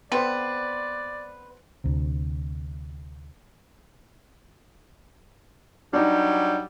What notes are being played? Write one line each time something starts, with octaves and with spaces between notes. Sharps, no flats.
D3 B3 C4 B4 C5 D5
D2 C3
F#3 G3 D4 D#4 G4